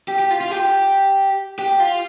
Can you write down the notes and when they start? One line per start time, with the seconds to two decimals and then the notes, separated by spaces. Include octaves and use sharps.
0.08 G4
0.19 G4
0.31 F4
0.41 F4
0.51 G4
1.59 G4
1.80 F4